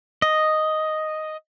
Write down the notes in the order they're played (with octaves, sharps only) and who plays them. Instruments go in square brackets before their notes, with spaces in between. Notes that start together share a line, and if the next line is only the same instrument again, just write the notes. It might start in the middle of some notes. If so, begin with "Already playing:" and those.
[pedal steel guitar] D#5